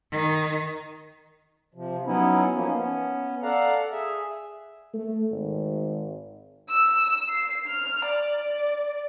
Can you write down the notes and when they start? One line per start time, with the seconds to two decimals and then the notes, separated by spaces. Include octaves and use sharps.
0.11 D#3
1.74 C3 F3
2.06 F#3 B3 C#4 D#4 E4
2.55 F3 A#3 C#4 D#4
2.72 B3 C#4
3.43 A4 D5 F5 F#5 A#5
3.92 G#4 E5
4.93 A3
5.31 G#1
6.69 E6
7.29 C7
7.67 F6
8.05 D5